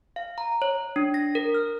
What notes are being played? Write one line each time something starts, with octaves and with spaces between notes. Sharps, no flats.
F5
A#5
C#5
D4
A#6
A#4
F6